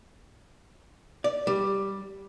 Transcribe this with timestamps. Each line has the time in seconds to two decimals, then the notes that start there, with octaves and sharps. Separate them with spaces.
1.24 D5
1.47 G3